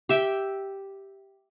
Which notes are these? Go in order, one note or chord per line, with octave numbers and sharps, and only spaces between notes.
G4 E5 G5